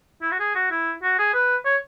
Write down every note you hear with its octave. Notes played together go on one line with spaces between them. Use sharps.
E4
F#4
G#4
F#4
E4
F#4
G#4
B4
C#5